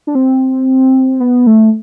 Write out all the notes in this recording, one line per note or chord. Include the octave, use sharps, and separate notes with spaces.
D4
C4
B3
A3